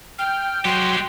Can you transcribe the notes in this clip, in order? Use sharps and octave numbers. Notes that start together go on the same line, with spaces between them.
G5 F6
F#3 G#3 G4 C6